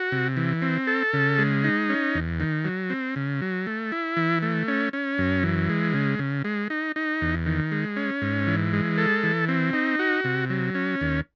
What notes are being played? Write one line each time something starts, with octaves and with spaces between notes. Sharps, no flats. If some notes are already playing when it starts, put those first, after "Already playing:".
Already playing: F#4
C3
E3
C4
A4
C#3
G#3
D#4
C#4
E2
D#3
F#3
C4
C#3
F#3
A3
E4
E3
A3
C#4
C#4
F#2
E3
G#3
C#3
C#3
G#3
D#4
D#4
E2
D#3
G#3
C#4
G#2
E3
G#3
A4
E3
C4
D#4
F#4
C3
F#3
C#4
D#2